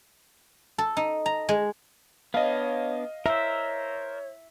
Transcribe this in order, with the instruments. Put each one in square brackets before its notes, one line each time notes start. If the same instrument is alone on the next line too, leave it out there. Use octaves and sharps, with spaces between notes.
[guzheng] A4
D#4
A#5
G#3
[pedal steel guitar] B3 D4 [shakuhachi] C#5 [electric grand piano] D#5 F5
[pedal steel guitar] A#4 C5 [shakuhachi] C#5 [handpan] E5